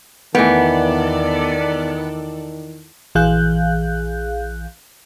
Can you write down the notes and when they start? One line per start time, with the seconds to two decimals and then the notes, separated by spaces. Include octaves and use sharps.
0.35 E2 D#3 E3 A3 B3 A4 D5 G5
3.15 A#1 E3 G#4 F5 F#6 G6